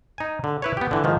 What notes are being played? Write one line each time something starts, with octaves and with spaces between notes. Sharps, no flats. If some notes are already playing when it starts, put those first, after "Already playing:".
D#4 G#5
D3
E4 B4 C#5
B3 G4
D3 E3
G#2 D#3 F3